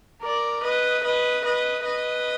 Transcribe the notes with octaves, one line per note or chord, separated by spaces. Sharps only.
A#4 D5
B4 D#5
B4 D#5
B4 D#5
B4 D#5